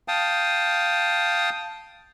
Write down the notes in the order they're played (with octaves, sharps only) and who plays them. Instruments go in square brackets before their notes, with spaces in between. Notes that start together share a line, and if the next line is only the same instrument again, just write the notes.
[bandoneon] F5 G5 A5 D#6